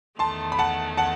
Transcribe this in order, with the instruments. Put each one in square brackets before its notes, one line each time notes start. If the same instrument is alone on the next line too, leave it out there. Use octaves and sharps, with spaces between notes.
[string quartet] E2 D#3 A3 [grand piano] A5 C6
[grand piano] B5
F#5 A5
F#5 A5